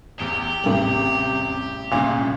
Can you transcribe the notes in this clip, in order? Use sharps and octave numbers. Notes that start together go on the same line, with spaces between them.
A1 E2 G4
A1 E2 C3 G3 F#7
G1 C2 A#2 C#3